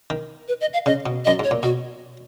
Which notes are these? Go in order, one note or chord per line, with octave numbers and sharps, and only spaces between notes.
D#3
B4
D#5
F5
C#3 D#5
B2
F#2 D#5
G#2 C#5
A#2
B2 F#4